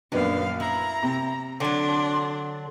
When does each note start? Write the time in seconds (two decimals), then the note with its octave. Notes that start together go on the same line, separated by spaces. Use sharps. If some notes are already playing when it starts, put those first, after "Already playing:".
0.12 A#1 F#2 D#3 B3 D4 F5
0.60 E4 A#5
1.03 C3
1.60 D3 F#3 D4 C6